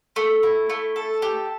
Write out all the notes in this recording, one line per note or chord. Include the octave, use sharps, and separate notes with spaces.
A3
E4
A3
A4
G4